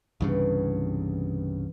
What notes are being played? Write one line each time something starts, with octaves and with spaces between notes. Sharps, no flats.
C2 G2 C#3 E3 B3